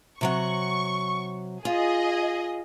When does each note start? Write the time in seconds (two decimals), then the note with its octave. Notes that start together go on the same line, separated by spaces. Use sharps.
0.21 C3 F#3 F#5 C#6
1.65 F4 G#4 D#5